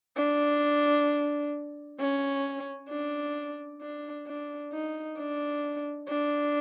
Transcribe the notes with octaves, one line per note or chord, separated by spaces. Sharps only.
D4
C#4
D4
D4
D4
D#4
D4
D4